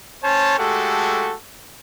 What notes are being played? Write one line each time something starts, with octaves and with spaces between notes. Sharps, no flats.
C#4 C5 C#5 A5
G#3 A3 F#4 G4 A4